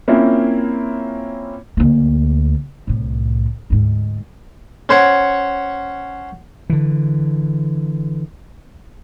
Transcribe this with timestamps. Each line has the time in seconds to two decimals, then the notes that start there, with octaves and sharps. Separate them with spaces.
0.08 A#3 C4 C#4 E4 F4
1.77 D2 A#3
2.87 C2 A2
3.70 D2 G#2
4.89 C#4 C5 C#5 F#5
6.70 D3 E3